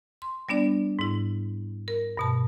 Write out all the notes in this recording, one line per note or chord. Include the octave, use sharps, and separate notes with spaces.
C6
G3 B3 D4 D5
G#2 E4
A#4
G2 B2 A5